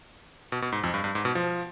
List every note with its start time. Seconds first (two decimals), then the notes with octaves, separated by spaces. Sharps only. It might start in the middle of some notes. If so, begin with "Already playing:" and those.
0.52 B2
0.62 B2
0.72 G#2
0.84 F2
0.94 G2
1.04 G2
1.15 G#2
1.25 B2
1.35 F3